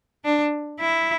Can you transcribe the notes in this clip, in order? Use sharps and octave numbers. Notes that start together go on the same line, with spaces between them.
D4
E4